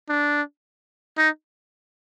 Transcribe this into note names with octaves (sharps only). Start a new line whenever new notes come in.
D4
D#4